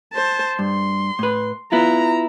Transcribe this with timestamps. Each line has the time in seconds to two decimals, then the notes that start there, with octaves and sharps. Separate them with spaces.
0.13 C5 A5
0.59 G2 C6
1.19 A2 B4
1.72 B3 E4 F4 A#5